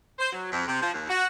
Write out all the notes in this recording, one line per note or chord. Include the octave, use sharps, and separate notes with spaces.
C5
F#3
F2
C3
F3
D#2
F#4